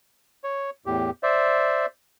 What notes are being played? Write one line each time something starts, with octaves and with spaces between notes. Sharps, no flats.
C#5
E2 A2 G4
C5 D5 E5